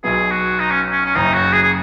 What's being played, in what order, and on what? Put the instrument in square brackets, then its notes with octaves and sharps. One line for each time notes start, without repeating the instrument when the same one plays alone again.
[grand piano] B1 B2 F#3 B3 [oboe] G#4
[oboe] F#4
D#4
C#4
C#4
C#4
[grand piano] F#1 F#2 C#3 [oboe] D#4
[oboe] F#4
G#4
G#4